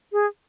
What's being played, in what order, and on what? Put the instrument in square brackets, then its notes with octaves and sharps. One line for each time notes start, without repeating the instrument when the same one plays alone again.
[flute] G#4